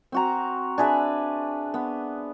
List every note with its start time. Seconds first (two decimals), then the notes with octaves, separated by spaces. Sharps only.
0.12 C4 F#4 A#5
0.78 D4 G#4 B4 E5
1.74 B3